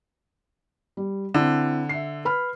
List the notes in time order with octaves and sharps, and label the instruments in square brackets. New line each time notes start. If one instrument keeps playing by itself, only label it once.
[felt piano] G3
[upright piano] D3 [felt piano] C4 E4
[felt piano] E5 C7
B4 B5 F6